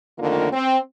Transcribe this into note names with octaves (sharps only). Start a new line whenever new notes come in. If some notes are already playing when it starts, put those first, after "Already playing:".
F2 D3 D#3 A3 A#3 F4
C4